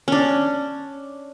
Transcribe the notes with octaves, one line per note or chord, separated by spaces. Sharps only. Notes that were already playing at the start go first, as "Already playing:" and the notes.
C#4 D4